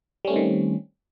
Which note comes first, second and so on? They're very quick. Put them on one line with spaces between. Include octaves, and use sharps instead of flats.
G3 C#4 A3 C4 D#3